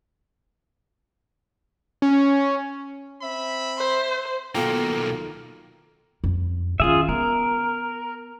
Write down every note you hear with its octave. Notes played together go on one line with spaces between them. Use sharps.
C#4
C4 E5 B5
C5
B1 B2 D#3 A#3 F4 A4 G5
F2
D#3 C#4 F4 G#4 E5
B3 A#4